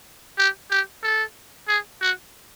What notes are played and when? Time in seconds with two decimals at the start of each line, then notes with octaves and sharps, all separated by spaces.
0.38 G4
0.71 G4
1.04 A4
1.68 G#4
2.01 F#4